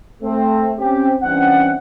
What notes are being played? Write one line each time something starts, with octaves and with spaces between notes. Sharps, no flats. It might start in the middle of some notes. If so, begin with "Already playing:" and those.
A3 C4
C4 C#4 G4
G2 E3 C4 C#4 F#5